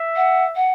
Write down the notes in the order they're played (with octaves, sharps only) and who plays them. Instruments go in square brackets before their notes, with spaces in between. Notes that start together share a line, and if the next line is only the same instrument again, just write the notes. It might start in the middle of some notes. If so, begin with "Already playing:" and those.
Already playing: [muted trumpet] E5
[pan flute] F#5
F#5